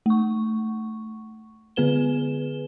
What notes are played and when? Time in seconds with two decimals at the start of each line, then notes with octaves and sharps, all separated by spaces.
0.06 A3 C#6
1.76 D3 B3 G#4 B4 E7 G7